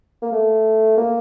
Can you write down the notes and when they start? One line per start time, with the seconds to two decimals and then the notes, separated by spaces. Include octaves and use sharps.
0.22 A#3
0.32 A3
0.98 A#3